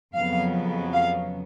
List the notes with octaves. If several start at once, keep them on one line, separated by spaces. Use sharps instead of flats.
F2 C#3 F#3 B3 F5
F5